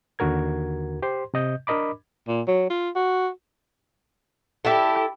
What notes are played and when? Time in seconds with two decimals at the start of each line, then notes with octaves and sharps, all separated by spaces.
0.19 D#2 D3 F#4 A#4 G#6
1.02 G4 C5 C6
1.34 C3 D#5 G6
1.67 D4 A#4 D#5 B5 D6
2.28 A#2
2.47 F#3
2.70 F4
2.95 F#4
4.65 E4 G4 A4